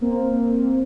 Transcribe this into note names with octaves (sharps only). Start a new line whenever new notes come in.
A#3 C4